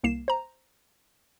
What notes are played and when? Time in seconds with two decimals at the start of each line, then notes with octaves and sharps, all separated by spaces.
0.04 C2 A#3 C7 E7
0.28 C5 A#5